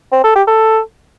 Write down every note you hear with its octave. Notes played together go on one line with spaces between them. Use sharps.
C4
A4
G4
A4